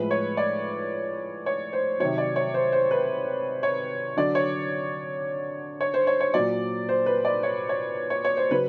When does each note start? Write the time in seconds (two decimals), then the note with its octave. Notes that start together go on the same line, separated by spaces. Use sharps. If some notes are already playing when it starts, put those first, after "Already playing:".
Already playing: A2 F3 G#3 B4
0.11 C#5
0.37 D5
1.46 C#5
1.73 C5
2.00 C3 D#3 F#3 C#5
2.18 D5
2.36 C#5
2.54 C5
2.72 C5
2.91 B4
3.63 C#5
4.17 D3 F#3 D5
4.35 C#5
5.81 C#5
5.94 C5
6.07 C#5
6.21 C#5
6.34 A#2 F#3 D5
6.89 C5
7.06 B4
7.25 D5
7.43 C#5
7.69 C#5
8.10 C#5
8.25 C#5
8.37 C5
8.51 C#3 F#3 B4